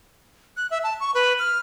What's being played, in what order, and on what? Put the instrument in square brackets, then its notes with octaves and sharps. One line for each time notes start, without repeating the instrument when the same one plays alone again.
[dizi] F#6
E5
A5
C#6
B4
F6